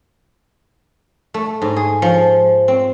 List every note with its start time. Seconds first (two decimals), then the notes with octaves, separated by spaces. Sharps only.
1.34 A3
1.62 G#2
1.76 G#4
2.02 F3
2.68 C4